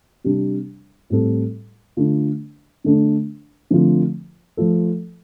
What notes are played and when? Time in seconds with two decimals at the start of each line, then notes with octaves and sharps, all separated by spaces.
0.24 C3 G3 D4
1.10 A2 G3 C4 A4
1.97 D3 A3 D4 F4
2.84 D3 A3 D4
3.70 D3 F3 A3 C4 F4
4.57 F3 A3 F4 A4